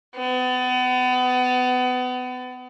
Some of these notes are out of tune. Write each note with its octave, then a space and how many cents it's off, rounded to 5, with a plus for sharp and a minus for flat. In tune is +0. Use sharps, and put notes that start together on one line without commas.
B3 +30